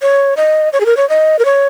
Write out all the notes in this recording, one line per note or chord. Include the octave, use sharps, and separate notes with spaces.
C#5
D#5
C#5
G#4
A#4
C#5
D#5
A#4
C#5